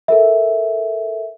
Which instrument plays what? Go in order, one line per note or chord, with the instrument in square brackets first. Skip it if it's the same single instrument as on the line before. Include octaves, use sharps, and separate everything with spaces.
[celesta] A4 A#4 E5